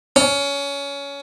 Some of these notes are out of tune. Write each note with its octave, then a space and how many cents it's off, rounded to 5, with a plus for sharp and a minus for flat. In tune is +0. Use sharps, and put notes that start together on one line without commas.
C#4 +20